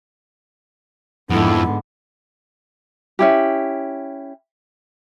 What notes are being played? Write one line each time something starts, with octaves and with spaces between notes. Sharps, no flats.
F2 G#2 D3 B3 E4
C#4 E4 G4